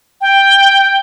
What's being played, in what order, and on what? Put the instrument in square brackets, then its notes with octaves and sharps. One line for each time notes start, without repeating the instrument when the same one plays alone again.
[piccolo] G5